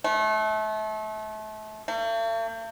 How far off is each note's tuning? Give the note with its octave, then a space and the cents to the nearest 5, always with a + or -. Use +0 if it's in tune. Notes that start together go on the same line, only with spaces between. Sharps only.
A3 -30
A3 +45